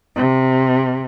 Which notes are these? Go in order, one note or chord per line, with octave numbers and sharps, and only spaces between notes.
C3